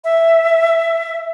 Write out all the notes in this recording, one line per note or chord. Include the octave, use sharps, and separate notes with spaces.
E5